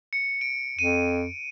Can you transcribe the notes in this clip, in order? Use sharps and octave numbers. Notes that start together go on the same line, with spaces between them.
C#7
D7
F2 D#7